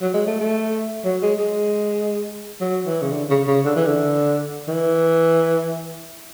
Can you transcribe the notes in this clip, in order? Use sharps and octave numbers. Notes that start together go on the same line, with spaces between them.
F#3
G#3
A3
A3
F#3
G#3
G#3
F#3
E3
C#3
D3
C#3
C#3
D3
E3
D3
E3